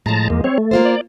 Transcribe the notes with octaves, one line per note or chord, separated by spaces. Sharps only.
A2 F3 G#3 A5 A#5
E2 A#3
C4 C#5
A3
A#3 F4 C5
D5